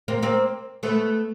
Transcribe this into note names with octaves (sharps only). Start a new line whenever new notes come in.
A#3 C4
A#3 C4
A3 B3